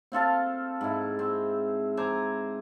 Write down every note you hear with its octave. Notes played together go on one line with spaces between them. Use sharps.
C4 F4 A4 F5
G#2 E4
C4
C5 G#5 A#5 D6